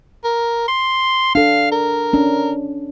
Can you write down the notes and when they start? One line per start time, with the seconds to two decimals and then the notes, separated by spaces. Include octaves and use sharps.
0.24 A#4
0.68 C6
1.35 D4 A4 F5
1.72 A#4
2.13 C#4 D4